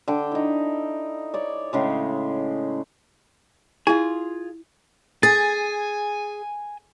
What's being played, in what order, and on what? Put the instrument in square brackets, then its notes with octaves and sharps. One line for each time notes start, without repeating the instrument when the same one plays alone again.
[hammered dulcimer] D3 G5
D#4 E4
C#5 D5
A2 C#3 G#3
[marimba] E4 [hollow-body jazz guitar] F4 G#4
[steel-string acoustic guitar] G#4 [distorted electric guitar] G#5 [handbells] A6